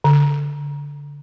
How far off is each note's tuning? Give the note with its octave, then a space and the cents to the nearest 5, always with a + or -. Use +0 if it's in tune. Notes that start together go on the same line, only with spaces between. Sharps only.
D3 -30